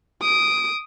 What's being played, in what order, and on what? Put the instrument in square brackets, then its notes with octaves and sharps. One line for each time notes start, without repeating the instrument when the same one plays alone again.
[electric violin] D#6 D7